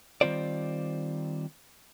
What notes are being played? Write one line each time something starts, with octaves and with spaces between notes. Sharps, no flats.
D#3 G3 C4 F4 C5 D5